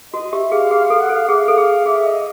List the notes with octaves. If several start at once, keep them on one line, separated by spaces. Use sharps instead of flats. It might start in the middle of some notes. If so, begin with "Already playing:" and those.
F#4 D#5
G4 E5
G#4 F5
G#4 F5
F5
A4
F#5
A4
F5
G#4 F5
E5
F5
A4
G#4
G#4 E5
D#5